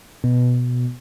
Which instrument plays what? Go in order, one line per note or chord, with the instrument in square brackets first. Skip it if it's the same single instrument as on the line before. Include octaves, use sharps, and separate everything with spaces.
[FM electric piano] B2